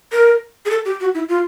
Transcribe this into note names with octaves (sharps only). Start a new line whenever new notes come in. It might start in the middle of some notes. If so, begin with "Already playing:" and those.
A#4
G#4
A4
G4
F#4
E4
F4